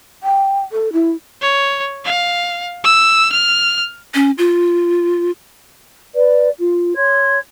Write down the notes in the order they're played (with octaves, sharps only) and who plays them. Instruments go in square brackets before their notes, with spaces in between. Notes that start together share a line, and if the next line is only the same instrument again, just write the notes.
[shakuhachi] G5
A4
E4
[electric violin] C#5
F5
E6
F6
[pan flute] C#4
F4
[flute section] B4 D5
F4
C#5 C6 G#6